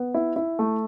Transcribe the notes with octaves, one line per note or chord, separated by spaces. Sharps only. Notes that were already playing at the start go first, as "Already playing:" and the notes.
Already playing: B3
E4
E4
A3